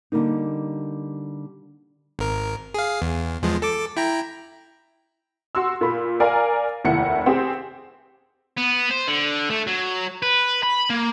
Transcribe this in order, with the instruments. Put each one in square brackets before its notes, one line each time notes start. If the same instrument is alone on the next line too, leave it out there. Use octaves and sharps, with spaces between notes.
[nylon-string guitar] D3 G3 A#3 D#4
[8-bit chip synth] G#1 A#4
G#4 F5
E2
E2 F3 G#3
A4 A5 D6
E4 G5 A#5
[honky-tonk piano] F#4 C6 E6
A#2 B5
A#4 D5 F5 G#5 A#5
F1 D#2 E4 F#5 C#7
C4 G4 G#4
[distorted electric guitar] B3
C5
D3
A3
F#3
B4
B5
A#3